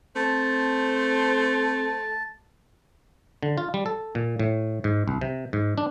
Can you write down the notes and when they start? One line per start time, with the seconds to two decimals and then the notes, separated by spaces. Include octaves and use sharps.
0.16 A3 C4 C5 A5
3.43 D3
3.58 F4
3.74 G3
3.86 A4
4.15 A#2
4.39 A2
4.84 G#2
5.08 C2
5.21 C3
5.53 G#2
5.78 D4